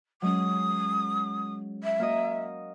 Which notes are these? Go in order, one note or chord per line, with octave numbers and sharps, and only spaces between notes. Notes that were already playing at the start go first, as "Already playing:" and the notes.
F#3 G#3 C#4 D#6
E5
A#3 F#4 D#5